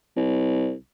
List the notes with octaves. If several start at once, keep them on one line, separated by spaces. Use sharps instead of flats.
C2